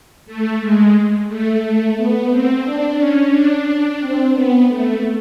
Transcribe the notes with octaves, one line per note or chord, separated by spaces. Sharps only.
A3
G#3
A3
B3
C4
D4
C#4
D4
D4
C4
B3
A3